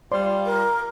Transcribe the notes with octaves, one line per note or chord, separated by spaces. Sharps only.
G3 F4 C5 D5 C6
A#4